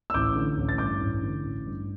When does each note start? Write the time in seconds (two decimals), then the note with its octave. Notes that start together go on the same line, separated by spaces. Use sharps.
0.10 E6
0.14 A1 D6 G6
0.36 D3
0.57 A1
0.69 A6
0.78 G2 D6 G6
1.01 A1
1.22 D3
1.44 A1
1.66 G2